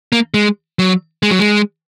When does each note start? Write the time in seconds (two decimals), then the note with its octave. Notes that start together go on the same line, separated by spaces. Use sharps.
0.12 A#3
0.34 G#3
0.79 F#3
1.23 G#3
1.31 F#3
1.39 G#3